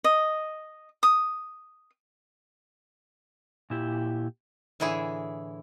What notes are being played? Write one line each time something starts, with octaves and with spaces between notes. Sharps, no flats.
D#5
D#6
A#2 E4 G4
A2 D3 E3 E4 G#4